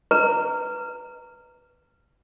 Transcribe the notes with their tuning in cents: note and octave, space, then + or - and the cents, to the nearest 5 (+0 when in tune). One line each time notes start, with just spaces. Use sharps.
B4 +0 A#5 -20